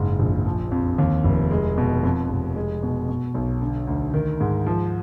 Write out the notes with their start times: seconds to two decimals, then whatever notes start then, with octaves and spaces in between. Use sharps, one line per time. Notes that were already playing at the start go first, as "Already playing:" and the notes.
Already playing: F#1 G#2
0.19 A#1
0.46 F3
0.72 F2
0.98 D#2
1.24 F1
1.51 G#3
1.78 B2
2.03 F2
2.29 F1
2.56 G#3
2.83 B2
3.09 B2
3.35 B1
3.62 D3
3.87 D2
4.14 D#3
4.40 G#2
4.66 F3